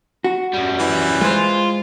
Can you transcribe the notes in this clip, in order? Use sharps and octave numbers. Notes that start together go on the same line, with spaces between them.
F#4
F#2 G3
E3
G#3 F4 C5